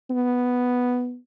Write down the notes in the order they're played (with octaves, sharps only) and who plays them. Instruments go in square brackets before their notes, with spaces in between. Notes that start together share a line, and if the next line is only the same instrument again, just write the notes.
[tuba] B3